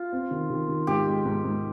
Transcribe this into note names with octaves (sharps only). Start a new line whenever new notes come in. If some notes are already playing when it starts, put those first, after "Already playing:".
Already playing: F4
C4
D#3
D#3
D#3
G#2 G4
G#3
G#2
G#2